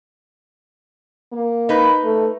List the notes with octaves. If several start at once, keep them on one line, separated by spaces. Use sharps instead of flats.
A#3
D#4 B4
A3